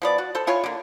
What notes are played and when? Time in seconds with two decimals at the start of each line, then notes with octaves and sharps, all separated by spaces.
0.02 F3 B3 D5
0.18 F#4
0.35 A4 C5
0.47 E4 F4 C#5 G#5
0.64 D3 A#3